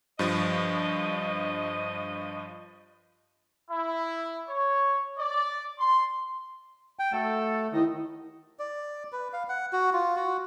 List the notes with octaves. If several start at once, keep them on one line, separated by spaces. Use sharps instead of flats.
G2 F3 D#5
E4
C#5
D5
C6
G5
A3 F#4 A4
D#2 D#3 E4 D#5
D5
B4
F5
F#5
F#4
F4
F#4